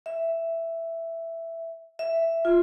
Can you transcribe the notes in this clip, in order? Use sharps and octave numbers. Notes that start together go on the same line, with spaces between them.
E5
E5
F4